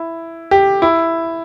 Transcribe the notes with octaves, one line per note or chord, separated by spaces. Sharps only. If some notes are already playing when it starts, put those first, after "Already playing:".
Already playing: E4
G4
E4